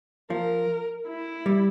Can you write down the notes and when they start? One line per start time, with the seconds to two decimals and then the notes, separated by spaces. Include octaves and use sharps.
0.30 F3 A#4
1.07 E4
1.46 G3